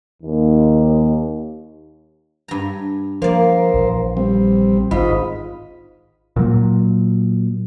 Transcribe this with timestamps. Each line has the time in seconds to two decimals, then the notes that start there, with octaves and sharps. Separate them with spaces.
0.22 D#2
2.48 G2 A#5
3.22 F3 A#3 A#4 C5 D5
3.73 A#1 E3
4.17 G3 C4
4.91 G#1 G#2 F4 D#5 B5
6.36 A#2 F#3